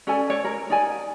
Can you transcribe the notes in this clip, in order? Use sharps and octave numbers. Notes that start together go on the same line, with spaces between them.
C#4 A4 D5 G#5
C#5 D5
A#4
D#4 D5 G#5